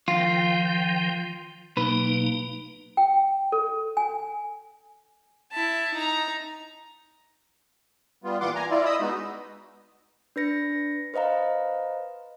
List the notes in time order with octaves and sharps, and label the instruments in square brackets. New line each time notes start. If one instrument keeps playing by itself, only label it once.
[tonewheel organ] D#3 F3 G5 [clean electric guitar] F4
[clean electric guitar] B1 B4 [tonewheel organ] A#3 D#4
[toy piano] G5
A4
G#5
[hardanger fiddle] E4 A5
D#4 A#5
[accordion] G3 B3 F4
A#2 E3 F4 F#5 C6 D6
G#5 A#5
E4 F4 D5
D#5 B5 D#6 E6
G#3 B3 D#4 F#4
[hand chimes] D4 B4 A#6 C#7
B4 C5 D#5 F5 A#5